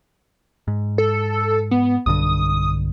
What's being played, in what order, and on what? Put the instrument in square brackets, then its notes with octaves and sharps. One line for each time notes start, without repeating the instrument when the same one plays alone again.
[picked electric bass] G#2
[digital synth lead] A4
B3
[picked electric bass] B1 G2 D3 [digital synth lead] D#6